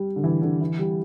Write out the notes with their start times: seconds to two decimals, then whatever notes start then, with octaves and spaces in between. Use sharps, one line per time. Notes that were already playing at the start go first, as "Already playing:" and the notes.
Already playing: G3
0.16 D3
0.24 E3
0.42 D3
0.61 E3
0.79 G3